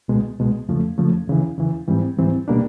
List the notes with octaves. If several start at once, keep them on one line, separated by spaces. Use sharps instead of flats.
C2 B2 G#3
C2 B2 G#3
F2 C#3 F3 A3
F2 C#3 F3 A3
E2 C#3 E3
E2 C#3 E3
G#2 E3 G3 C4
G#2 E3 G3 C4
B2 G3 A#3 D4